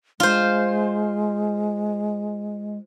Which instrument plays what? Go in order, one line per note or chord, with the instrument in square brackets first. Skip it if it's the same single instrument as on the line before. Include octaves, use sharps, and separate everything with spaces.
[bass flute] G#3 [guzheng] F4 C5